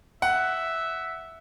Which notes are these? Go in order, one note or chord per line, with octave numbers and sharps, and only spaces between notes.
E5 F#5